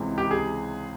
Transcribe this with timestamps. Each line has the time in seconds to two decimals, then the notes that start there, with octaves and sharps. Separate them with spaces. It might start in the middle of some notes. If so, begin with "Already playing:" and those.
Already playing: C#2 C3 E3 G#3
0.18 G4
0.31 G#4